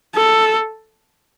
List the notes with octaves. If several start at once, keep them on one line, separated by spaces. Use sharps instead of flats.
A4